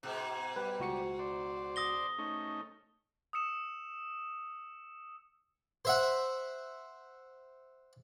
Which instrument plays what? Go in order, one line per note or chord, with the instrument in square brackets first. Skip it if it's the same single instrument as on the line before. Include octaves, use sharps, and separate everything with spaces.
[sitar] G#2 B2
[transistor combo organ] G3 [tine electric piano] B4
[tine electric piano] C#2 F#4 C#7
[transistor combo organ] C5 D5
[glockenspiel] D#6 A#6 G7
[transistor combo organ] A3 C#4 D#4
[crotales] D#6 E6 C#7 E7
[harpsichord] C5 E5 F#5